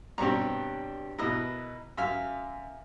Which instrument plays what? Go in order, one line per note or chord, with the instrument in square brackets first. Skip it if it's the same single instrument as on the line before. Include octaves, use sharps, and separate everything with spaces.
[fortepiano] G2 B2 C4 [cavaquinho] G4 C#5 A#5
[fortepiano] B2 E4 [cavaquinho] A#4 B4 D#5
[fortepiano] F#2 [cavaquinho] E5 F5 G#5